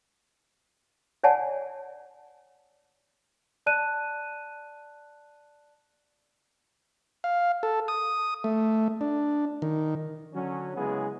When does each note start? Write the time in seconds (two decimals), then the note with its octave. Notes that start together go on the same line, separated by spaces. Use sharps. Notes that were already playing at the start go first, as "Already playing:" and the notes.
1.24 C#5 D5 F#5 G#5 A5
3.66 D5 A5 F#6 D#7
7.24 F5
7.63 A4
7.88 D#6
8.44 A3
9.01 D4
9.62 D#3
10.34 D3 F#3 C#4
10.76 C#3 G#3 B3 E4 F#4 G#4